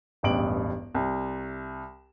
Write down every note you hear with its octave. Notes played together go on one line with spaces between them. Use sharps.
E1 A1 G2 D7 F#7
C2